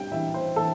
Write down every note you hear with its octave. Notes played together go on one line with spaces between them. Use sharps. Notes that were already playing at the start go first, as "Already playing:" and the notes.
Already playing: G3 G5
E3 E5
C5
E3 A4